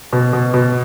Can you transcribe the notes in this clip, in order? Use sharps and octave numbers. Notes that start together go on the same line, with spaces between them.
B2
B2
B2